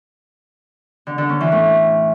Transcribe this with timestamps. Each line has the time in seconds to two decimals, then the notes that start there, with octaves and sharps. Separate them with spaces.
1.07 D3
1.18 D3
1.29 C#4
1.41 E3
1.52 A2